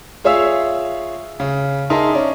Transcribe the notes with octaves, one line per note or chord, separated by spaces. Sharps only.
F4 G#4 C#5 E5 F5 E6
C#3
D#4 G#4 A#4 E5 A5 C6
C#4 D5